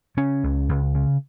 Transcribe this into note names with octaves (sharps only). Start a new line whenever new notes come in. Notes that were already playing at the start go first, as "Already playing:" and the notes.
C#3 C#4
C#2
C#2
C#3